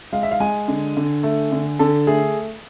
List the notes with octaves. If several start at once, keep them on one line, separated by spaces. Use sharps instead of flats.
G#3 F5
E5
F5
G#3 G#5
D3
D3
A3
D3
D3 A4
A3 G#4